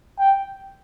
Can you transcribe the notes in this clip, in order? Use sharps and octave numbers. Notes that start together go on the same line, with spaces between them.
G5